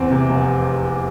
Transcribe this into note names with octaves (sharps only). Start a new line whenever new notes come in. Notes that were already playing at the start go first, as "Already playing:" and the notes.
Already playing: E2 C4
C3
F1